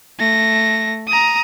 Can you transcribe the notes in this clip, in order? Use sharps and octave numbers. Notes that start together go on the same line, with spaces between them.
A3 A#6
A#5 D#6